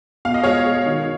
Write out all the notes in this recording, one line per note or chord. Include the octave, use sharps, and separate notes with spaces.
B2 F5
D#5
G#3 C#5 F5
G#3
D#3